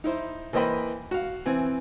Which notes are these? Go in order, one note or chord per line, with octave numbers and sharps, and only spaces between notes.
D#4 E4 C5
E3 A#3 C5 D#5 G5 B5
F#4 F5
E3 C4 G#5